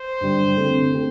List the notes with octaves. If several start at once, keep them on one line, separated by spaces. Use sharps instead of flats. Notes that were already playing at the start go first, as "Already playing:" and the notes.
Already playing: C5
G2 D3 G3
D3 A3 C4 G4
D3 A3 C4 G4